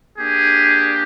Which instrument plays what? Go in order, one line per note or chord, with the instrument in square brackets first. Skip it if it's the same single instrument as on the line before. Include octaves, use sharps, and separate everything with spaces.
[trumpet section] A#3 D4 G4 G#4